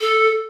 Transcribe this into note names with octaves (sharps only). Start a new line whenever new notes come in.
A4